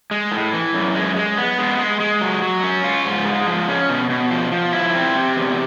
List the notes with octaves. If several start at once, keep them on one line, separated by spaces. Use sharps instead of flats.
G#3
A2
E3
F#2
G#3
G#3
B3
G#3
G#3
G#3
F#3
F#3
C#4
F4
G#2
G#3
F3
C#4
B2
B2
F3
F3
E4
C4
C3
E2